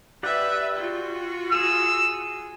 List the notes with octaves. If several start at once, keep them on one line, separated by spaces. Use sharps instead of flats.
G4 B4 D5 E5 F#5
F4 F#4
G#4 E6